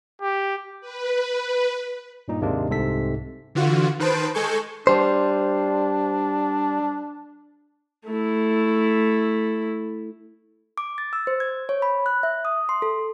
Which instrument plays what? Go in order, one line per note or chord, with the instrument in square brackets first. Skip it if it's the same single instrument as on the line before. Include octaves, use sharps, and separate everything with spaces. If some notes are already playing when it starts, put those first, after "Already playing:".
[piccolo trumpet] G4
[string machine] B4
[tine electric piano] G2 A#2 D#4
D#2 G#2 C3 G#3 A#3 D4
C2 G#2 C3 A4 B6
[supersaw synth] D3 E3 F4 F#4
D#3 B4 C5 A5 D7
G#3 A4 G#5 C#6 G6
[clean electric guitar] G3 C5 [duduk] D4
[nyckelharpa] A3 E4
[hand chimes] D6
A6
E6
C5
G#6
C#5
B5
F#6
E5
D#6
C6
A4